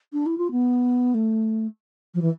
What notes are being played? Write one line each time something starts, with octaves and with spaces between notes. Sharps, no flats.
D4
E4
F4
B3
A3
F3
E3